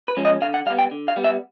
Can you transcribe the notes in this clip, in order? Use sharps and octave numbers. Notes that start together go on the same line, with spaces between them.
B4
F3 G#3 C#4
D#5
D3 F5
F#5
G3 B3 F5
G5
D3
F5
G3 B3
E5